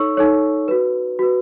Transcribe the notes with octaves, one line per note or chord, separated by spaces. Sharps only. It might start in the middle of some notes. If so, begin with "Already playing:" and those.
Already playing: D#4 A4 C#5 C#6 E6
D#4 A4 C#5
F#4 B4
F#4 B4